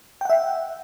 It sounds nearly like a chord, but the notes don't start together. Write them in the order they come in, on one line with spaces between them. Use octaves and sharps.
G5 F#5 E5